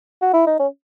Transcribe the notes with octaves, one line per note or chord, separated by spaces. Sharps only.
F#4
E4
D#4
C#4